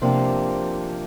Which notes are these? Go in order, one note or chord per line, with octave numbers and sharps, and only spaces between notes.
C3 F3 A#3 D4 G4